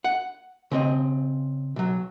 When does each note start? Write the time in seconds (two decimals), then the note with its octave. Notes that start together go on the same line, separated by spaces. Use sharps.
0.04 F#5
0.71 C#3 C4 D#5
1.76 B1 F#3